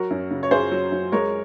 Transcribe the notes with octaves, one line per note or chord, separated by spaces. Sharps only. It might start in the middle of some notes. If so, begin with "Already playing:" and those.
Already playing: F#3 F#4 A#4
F#2
C#3
C#5
F#2 G#4 C5
F#3
F#2
G#3 A#4 C#5